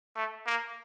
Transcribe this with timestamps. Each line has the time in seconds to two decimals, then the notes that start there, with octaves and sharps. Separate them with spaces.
0.16 A3
0.46 A#3